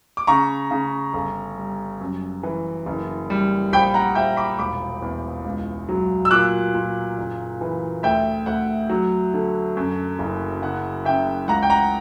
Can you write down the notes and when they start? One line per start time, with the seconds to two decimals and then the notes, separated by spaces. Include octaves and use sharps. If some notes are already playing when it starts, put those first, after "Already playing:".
0.17 D6
0.27 C#3 A#5 C#6
0.71 C#3
1.13 G1
1.58 G3
2.01 F#2
2.43 E3
2.86 F#1
3.30 G3
3.72 A#1 G5 B5
3.94 F#5 A#5
4.15 A#1 E5 G5
4.37 B5 D6
4.59 E1 B5 D6
5.02 E2
5.45 C#2
5.89 F#3
6.25 E6
6.31 A#2 D6 F#6
6.74 A#2
7.18 F#1
7.61 E3
8.03 D2 E5 G5
8.46 D2 F#5
8.90 F#3
9.34 D3
9.77 F#2
10.19 F#1
10.62 C#3 F#5
11.05 C#3 E5 G5
11.48 C#2 F#5 A#5
11.63 G5
11.70 F#5 A#5